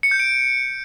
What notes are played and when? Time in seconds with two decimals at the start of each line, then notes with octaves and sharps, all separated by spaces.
0.03 C#7
0.11 G6
0.20 D7